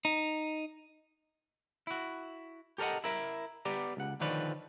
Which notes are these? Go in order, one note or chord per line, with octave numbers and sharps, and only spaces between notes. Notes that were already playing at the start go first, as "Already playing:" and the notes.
D#4
E4 F#4
G4 A4 A#4 C#5 D#5 F#5
E4 A#4 E5
B3 G4 D5 A#5
C#2 F#5
D3 D#3 F3 B4 C#5 D5